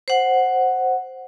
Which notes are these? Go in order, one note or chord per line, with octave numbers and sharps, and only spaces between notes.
C5 F#5